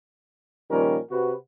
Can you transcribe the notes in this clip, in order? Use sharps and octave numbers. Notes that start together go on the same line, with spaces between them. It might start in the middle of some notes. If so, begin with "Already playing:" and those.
A#2 D#3 F3 G3 C#4 A#4
C3 F#4 B4